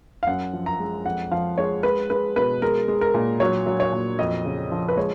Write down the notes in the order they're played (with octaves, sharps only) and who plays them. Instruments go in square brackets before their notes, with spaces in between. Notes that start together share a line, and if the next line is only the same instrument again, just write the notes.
[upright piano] F5
F#2 F#5
F3
A#5
G#3
F2 F#5
F3 F5
G#3 C#5
G#3 B4
G#3 B4
B2 B4
G#3 A#4
G#3
A#4
A#2
F#3 C#5
F#3
C#5
A#2
F2 D#5
C#3
F3
B4
G#3 C#5